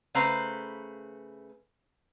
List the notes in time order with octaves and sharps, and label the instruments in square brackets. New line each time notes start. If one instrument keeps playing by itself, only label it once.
[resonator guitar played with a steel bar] C#3 A3 B4 C5 F5 A#5